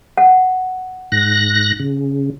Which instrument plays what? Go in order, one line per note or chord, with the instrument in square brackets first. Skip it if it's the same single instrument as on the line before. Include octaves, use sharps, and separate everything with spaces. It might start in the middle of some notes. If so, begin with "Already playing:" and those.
[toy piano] F#5
[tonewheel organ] G#2 F#6 A#6
C#3